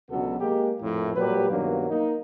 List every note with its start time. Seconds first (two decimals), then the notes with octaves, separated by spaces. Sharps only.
0.11 C#2 B2 D3 F#3 B3 A4
0.40 G#3 A#3 G4
0.82 A#1 F2 A2
1.16 A#2 F#3 G3 G4 B4
1.50 G2 B2 D#3 F#3 A#3 C4
1.90 A#3 D#4